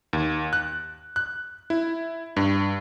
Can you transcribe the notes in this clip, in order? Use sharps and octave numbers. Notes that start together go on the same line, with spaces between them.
D#2
F#6
F#6
E4
G2